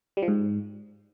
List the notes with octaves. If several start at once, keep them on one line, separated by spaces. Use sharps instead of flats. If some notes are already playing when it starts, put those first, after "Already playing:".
G3
F3
G#2